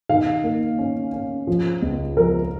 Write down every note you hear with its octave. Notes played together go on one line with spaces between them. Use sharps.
D#3 F5
A#3
C#4
C#4
F3
C#2
F3 A#4